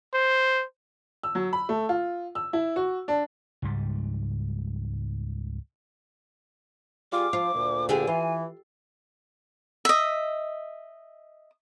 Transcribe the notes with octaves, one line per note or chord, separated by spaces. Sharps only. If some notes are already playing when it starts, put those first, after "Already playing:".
C5
E6
F#3
B5
A3
F4
E6
E4
F#4
D4
C#2 G#2 G3
G3 F4 G#4 D6
F3 F4
D2 A#2
D3 G4 G#4 G#5
E3 F4
D#5 E5